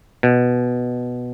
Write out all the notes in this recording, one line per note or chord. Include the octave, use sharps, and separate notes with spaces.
B2